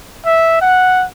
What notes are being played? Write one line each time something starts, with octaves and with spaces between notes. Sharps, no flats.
E5
F#5